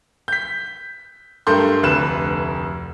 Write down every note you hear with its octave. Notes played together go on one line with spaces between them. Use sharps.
G6 B6
G2 A3 A4 A#4 C6 G6
F1 D2 B4 F#6 E7